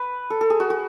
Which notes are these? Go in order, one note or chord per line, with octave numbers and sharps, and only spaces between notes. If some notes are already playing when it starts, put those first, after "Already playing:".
Already playing: B4
A4
A4
G#4
F#4
F#4